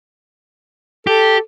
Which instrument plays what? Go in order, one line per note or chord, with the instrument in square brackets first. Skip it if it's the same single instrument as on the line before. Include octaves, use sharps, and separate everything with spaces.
[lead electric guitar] G4 [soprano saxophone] A4